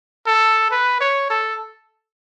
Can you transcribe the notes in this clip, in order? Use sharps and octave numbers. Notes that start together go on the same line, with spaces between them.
A4
B4
C#5
A4